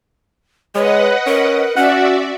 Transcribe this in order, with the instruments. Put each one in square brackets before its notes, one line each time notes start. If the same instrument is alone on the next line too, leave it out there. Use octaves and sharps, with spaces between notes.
[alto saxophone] G#3 [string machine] B4 D#5 F#5 [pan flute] C#5
[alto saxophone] C#4 [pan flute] A#4
[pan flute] C#4 [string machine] F#4 D5 E5 [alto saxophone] F#5